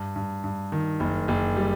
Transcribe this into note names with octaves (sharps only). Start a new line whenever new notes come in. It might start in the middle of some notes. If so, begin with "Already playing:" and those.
Already playing: G2
G2
G2
D#3
F#1
F#1
G3